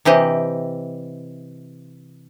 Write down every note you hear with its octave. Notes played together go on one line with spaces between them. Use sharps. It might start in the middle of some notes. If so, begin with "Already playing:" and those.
C3 E3 G4 D#5